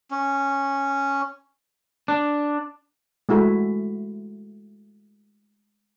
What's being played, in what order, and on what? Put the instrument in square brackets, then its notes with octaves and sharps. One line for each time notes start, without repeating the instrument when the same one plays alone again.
[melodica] C#4
[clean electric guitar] D4
[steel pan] G#3 A3 E4 F#4 A4